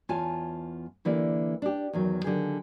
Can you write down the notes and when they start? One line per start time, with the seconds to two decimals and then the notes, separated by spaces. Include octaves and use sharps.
0.09 E2 F4 C#5 G#5 A5
1.05 D3 E3 A#3 E4 G4 D5
1.62 D4 G4
1.93 E2 D#3 F#3
2.24 D3 D#3 F#3 G4 G#4